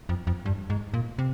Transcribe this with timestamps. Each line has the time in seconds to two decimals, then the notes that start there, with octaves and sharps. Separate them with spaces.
0.09 F2
0.27 F2
0.46 G2
0.70 G#2
0.94 A#2
1.19 C3